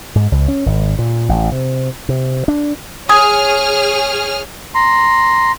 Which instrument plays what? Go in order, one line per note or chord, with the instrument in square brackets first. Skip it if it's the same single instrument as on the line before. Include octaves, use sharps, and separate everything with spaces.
[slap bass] G#2
C#2
C#4
G#1
A#2
A1
C3
C3
D4
[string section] G#4 C#5 F6 [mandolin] G#5 [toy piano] D#6
[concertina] A#5 C6